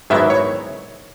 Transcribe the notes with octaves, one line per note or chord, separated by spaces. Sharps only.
G#2 D#3 F#3 B3 E4 E5
C#5